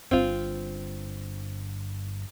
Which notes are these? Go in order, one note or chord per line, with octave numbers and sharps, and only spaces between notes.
G1 G2 C4 F4